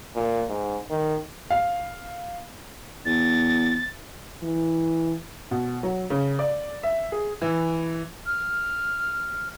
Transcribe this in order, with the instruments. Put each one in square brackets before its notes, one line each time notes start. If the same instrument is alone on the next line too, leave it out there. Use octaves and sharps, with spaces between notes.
[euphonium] A#2
G#2
D#3
[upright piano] F5
[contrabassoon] E2 [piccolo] A6
[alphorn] E3
[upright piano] B2
F#3
C#3
D5
E5
G#4
[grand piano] E3
[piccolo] F6